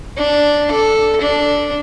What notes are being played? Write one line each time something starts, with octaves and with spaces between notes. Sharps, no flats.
D4
A4
D4